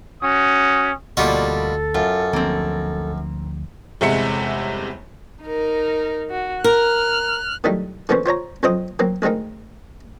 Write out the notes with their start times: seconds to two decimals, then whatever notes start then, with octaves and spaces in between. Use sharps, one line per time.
0.23 C#4 F#4 D#6
1.17 D2 B2 G3 A#3 F4 F#4 A4 D#5
1.95 F#2 F4
2.33 D2 F3 A#3 C4 D4
4.01 G1 E2 C3 G#3 E5 C#7
5.43 D#4 A#4
6.30 F#4
6.64 A#4 F6 F#6
7.64 D#3 F#3 G3 A3 D#4 E4
8.09 D3 E3 A#3 B3 C#4 C5
8.26 F4 C5 C#5 A#5
8.63 F2 F#3 C4 C5 D#5 D#6
8.99 F#3 A#3 C4
9.22 D2 G#3 C4 D#4 A#4